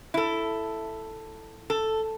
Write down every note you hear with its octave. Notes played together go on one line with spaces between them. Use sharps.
E4 A4
A4